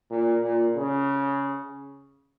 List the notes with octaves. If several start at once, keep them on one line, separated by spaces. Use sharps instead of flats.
A#2
A#2
C#3